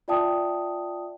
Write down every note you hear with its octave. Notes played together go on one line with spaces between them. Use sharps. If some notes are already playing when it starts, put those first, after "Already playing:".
F4 D5 E5 G5 A5 D#6